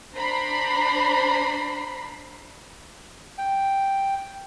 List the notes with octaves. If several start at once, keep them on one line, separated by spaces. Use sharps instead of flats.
D4 C5 A#5 B5 C7
G5